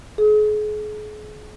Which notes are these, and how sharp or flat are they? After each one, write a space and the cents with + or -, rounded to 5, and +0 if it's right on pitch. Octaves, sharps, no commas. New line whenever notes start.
G#4 +35